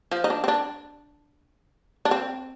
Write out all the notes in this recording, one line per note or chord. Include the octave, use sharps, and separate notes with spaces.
F3
D#4
D4
C4
D4
D4
C4